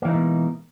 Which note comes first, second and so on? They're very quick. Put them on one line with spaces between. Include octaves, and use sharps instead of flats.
A#3 E3 D#4 G#3 B2